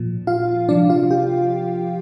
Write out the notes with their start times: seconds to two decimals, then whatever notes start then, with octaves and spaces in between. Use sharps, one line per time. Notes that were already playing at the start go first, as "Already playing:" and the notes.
Already playing: A#2 F3
0.27 F4 F5
0.69 C3 F3 D4 D5
0.89 F4 F5
1.11 G4 G5